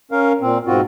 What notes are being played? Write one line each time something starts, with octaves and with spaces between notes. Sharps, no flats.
C#4 A#4 F5
A#2 C4
G#2 B2 C4 F4 F#4